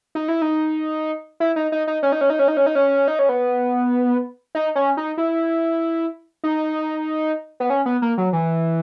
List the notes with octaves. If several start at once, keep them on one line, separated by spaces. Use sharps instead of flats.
D#4
E4
D#4
E4
D#4
D#4
D#4
C#4
D#4
C#4
D#4
C#4
D#4
C#4
D#4
C#4
D#4
C#4
B3
D#4
C#4
D#4
E4
D#4
B3
C#4
B3
A#3
F#3
E3